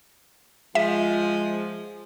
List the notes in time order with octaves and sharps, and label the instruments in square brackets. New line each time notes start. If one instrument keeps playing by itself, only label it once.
[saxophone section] F3 [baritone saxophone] G#3 [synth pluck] E5